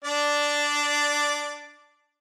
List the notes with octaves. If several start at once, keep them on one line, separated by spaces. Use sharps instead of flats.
D4 D5